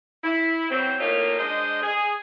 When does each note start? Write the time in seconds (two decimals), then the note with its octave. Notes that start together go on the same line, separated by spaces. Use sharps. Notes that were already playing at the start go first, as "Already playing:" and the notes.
0.23 E4
0.69 E3 F#3 C4
0.99 A2 A#3 C#4 D#4 F4
1.38 G#3 D4 C5 D#5
1.82 G#4